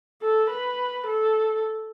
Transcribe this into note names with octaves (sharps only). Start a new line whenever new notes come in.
A4
B4
A4